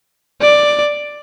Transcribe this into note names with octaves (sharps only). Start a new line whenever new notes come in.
D5